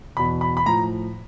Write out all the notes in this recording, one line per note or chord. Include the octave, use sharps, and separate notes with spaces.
E2 B2 B5
B5
B5
A2 F3 A#5